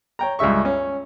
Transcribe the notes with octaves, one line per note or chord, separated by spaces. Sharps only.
C#5 G5 A#5
C#2 G2 C#3 E5 C#6
C#4